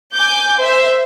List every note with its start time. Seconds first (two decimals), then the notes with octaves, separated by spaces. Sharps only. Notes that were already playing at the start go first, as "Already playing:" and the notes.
0.14 G#5 D6 G6
0.58 C5 E5